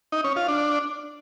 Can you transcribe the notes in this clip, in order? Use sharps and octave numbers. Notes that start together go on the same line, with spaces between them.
D#4
C#4
F4
D4